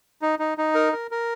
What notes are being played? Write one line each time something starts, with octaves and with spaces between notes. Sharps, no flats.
D#4
D#4
D#4
A#4
A#4
A#4